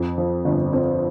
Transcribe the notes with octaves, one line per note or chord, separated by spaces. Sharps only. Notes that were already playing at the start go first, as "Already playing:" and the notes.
Already playing: F2
F3
G1
C4